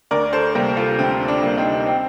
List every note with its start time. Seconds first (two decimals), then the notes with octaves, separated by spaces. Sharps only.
0.11 D2 A#4 D5
0.33 A4 C5
0.55 C3 G3 A#3 G4 A#4
0.76 F4 A4
0.99 D2 C4
1.28 D4
1.42 C3 G3 A#3
1.58 C4 D#4
1.86 C4